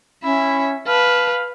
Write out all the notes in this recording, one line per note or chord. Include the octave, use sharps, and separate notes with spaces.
C#4 E4 E5
B4 F5 A5